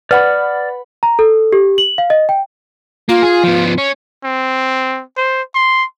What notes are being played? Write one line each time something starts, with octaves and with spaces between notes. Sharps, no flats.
B4 D5 F#5 B5 F6
A#5
A4
G4
F#7
F5
D#5
G5
A#3 F4
G#4
F3 B3
C#4
C4
C5
C6